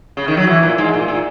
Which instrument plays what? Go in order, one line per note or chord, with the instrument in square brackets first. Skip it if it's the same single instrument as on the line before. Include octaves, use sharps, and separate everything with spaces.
[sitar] C#3
D#3
F#3
E3
A#2
G#2
A#2
A#2